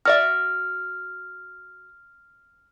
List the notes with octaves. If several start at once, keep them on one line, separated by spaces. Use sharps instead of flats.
F#4 D5 E5 F6